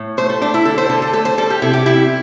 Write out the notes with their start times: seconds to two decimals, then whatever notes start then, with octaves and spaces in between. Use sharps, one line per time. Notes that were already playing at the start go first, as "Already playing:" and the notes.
Already playing: A2
0.17 A3 C5
0.30 A4
0.42 A3 D4
0.54 E4
0.65 D3 A4
0.78 C5
0.89 D3 A4
1.02 A4
1.13 A3 A4
1.25 C5
1.38 G3 A4
1.50 G4
1.62 C3 E4
1.73 G4
1.86 C3 E4